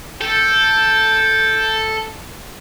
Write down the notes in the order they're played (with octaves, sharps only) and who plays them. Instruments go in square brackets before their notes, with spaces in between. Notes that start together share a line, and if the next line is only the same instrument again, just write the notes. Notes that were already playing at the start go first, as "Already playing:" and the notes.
[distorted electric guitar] A4 [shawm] G5